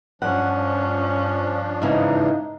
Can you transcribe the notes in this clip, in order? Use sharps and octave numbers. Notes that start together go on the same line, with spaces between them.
G2 F3 C#4 D4 F#5
G#2 C#3 E3 D#4